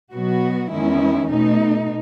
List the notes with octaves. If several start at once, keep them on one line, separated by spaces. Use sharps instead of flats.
B2 F#3 B3 F#4
E2 D#3 G#3 C#4 E4
B2 A3 D#4